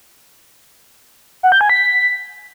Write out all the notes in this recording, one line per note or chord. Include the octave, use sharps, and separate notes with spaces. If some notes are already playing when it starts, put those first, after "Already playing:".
F#5
G6
G#5
B6